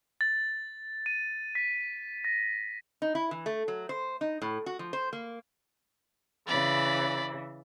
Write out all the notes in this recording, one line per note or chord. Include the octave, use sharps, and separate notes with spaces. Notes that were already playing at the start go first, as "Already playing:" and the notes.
A6
D#7
B6
A#6
D#4
E4
E3
A3
F#3
C5
D#4
A2
F#4
F3
C5
A#3
C#3 E3 D5 B5